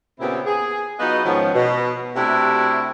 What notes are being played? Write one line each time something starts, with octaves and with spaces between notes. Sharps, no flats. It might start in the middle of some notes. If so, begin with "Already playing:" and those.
A#2 C#3 B3 C4 E4 G4
G#4
F#3 B3 D#4 F4 F#4 D#5
G#2 D#3 F3 B3 C#4
B2
C3 A3 D4 E4 F#4 G4